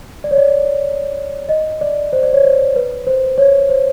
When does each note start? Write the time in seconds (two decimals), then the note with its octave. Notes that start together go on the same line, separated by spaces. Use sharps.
0.24 D5
0.31 C#5
0.37 D5
1.49 D#5
1.81 D5
2.13 C5
2.23 D5
2.33 C#5
2.44 C5
2.76 B4
3.07 C5
3.38 C#5
3.69 C5